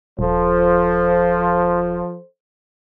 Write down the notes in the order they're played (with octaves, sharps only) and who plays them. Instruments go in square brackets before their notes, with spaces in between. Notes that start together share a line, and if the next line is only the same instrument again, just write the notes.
[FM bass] D#1 [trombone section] F3 [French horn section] A4 C5